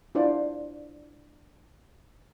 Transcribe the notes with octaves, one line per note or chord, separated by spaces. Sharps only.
D4 E4 F4 C5 D5